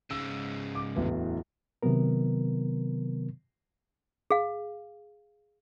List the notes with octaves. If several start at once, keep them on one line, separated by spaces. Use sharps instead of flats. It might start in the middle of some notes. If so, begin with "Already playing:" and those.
G#2 C#3 E6
D6
D1 E2 B4
C3 D#3 F#3 B3 A#4
G#4 F5